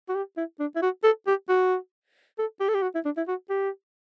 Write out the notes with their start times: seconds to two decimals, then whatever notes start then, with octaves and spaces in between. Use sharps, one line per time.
0.09 F#4
0.15 G4
0.37 E4
0.60 D4
0.76 E4
0.82 F#4
1.04 A4
1.27 G4
1.49 F#4
2.39 A4
2.60 G4
2.69 A4
2.75 G4
2.83 F#4
2.95 E4
3.05 D4
3.17 E4
3.28 F#4
3.50 G4